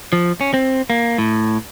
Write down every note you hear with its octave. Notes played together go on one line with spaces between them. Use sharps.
F3
C#4
C4
A#3
A2